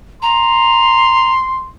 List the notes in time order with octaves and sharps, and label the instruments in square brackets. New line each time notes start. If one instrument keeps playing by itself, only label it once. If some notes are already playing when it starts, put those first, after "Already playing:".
[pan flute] A#5 [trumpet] C6